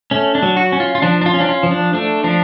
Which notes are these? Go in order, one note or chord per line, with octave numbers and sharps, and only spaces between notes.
A3 C#4
D4
F#3
F#4
C#4
F4
F4
F3 D4
D4
F4
C#4
D4
F4
F3
D4
A3 D4
F3 D4